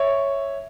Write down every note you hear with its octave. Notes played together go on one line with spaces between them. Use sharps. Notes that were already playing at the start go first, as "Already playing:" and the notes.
Already playing: C#5 E5